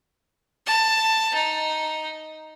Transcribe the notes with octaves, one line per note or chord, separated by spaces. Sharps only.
A5
D#4